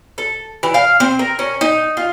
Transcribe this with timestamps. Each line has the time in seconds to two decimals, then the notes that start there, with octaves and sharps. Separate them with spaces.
0.18 A4
0.63 E3
0.74 F5
1.00 C4
1.19 A#4
1.39 C#4
1.61 D#4
1.97 F4